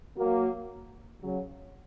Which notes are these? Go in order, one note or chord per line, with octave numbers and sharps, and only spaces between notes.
F#3 A#3
C#3 F#3